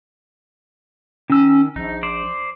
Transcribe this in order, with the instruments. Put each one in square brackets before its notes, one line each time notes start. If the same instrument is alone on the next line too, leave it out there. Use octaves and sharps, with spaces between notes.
[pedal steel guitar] D#3 E6 [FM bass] C#4
[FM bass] A#1 [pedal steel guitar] D#4
[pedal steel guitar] C5 D5